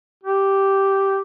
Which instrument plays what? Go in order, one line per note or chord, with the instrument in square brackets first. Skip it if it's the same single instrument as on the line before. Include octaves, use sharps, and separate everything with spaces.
[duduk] G4